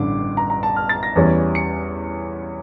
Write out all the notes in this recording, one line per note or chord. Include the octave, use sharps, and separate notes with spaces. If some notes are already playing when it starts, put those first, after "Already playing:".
Already playing: A1 G2 D3 D6
A#5
A#5
A5
F6
A6
A#6
E2 E3 G3 C#4
C#7